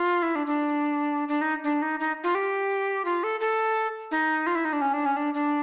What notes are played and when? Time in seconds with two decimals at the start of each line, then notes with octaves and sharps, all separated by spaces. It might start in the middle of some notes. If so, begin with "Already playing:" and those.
Already playing: F4
0.23 E4
0.35 D4
0.47 D4
1.28 D4
1.41 D#4
1.64 D4
1.82 D#4
2.00 D#4
2.24 F4
2.35 G4
3.05 F4
3.23 A4
3.40 A4
4.11 D#4
4.47 F4
4.55 E4
4.65 D#4
4.73 D4
4.81 C#4
4.93 D4
5.06 C#4
5.17 D4
5.34 D4